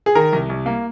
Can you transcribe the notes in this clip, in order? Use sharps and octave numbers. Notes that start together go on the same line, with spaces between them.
G#4
D#3 A#4
C2
C2
A#3